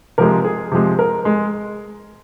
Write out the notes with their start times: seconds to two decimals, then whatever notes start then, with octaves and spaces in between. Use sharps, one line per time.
0.18 C3 F3 G#3 A#4
0.44 G#4
0.72 C3 F3 G#3
0.99 A#4
1.25 G#3